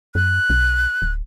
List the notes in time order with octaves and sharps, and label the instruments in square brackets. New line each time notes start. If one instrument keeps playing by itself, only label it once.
[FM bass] F#2 [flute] F#6
[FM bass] B1
D1